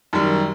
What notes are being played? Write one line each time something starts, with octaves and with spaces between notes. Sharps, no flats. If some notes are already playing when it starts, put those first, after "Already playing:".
F#2 D#3 G3